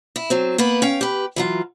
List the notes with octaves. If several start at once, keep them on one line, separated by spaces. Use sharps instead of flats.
E4
F#3 C4
A#3 B3 B4
C#4 F5 G5
G4 B4
E3 F#3 F4